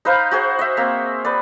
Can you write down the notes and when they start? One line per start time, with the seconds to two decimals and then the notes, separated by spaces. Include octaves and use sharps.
0.05 D#4 B4 C5 F5
0.31 F#4 G#4 C5
0.59 D#5 E5
0.77 A#3 C4
1.25 B4 D5